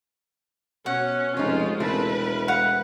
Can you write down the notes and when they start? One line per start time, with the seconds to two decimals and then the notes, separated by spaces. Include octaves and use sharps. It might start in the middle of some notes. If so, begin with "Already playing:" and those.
0.86 B2 C#4 F#5
1.37 F1 G#3 C#4 D#4 F4
1.80 E1 A3 C4 E4 A#4 B4
2.48 F5 F#5